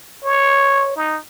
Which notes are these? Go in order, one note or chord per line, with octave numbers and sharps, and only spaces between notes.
C#5
D#4